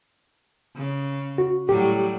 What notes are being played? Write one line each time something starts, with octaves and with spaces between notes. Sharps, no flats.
C#3
F#4
A2 F#3 G3 G4